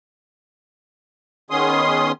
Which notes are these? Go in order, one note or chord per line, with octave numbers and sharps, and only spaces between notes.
D#3 B3 C#4 G#4 C6 D#6